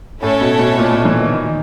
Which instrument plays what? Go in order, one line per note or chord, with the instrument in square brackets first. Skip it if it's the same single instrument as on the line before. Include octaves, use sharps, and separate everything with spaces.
[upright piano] A2 [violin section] A3 C#4 E4 A4 C#5
[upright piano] B2
B2
A#2
A#2
E3
D#3
D#3